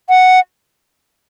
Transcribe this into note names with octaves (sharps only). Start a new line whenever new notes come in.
F#5